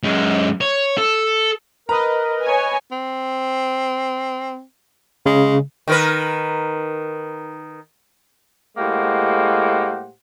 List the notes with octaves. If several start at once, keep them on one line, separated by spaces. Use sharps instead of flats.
F#2 G#3
C#5
A4
A#4 B4 D#5 A#5 B5
C#5 G#5
C4
C#3 G#3
D#3 A#4 B4
A2 G#3 A#3 G4 C5 F#5